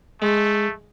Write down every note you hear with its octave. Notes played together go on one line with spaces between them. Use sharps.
G#3 A3